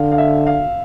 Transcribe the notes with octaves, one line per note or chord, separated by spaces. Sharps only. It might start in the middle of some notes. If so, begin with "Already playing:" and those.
Already playing: D3 F5
F5
E5
F5